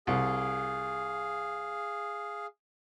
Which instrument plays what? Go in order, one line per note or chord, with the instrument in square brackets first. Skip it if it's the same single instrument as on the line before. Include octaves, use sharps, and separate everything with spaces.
[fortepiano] C2 [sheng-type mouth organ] G#4 F5